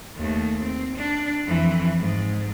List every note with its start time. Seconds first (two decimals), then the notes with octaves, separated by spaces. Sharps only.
0.16 D#2 A3
0.63 C4
0.96 D4
1.47 F2 E3
1.98 G#2